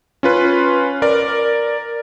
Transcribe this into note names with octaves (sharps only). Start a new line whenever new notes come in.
C#4 F4 B4
A#4 D5